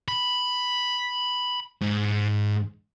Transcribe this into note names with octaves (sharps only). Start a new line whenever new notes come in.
B5
G#2